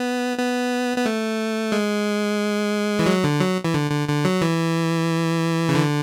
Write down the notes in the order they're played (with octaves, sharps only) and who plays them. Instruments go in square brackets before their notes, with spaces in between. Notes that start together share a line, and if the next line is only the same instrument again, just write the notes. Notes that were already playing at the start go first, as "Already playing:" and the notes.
Already playing: [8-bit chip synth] B3
B3
B3
A3
G#3
E3
F#3
D3
F#3
E3
D3
D3
D3
F#3
E3
C#3
D3